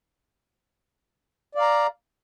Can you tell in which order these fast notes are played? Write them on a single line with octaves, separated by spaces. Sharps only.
D5 F5 A#5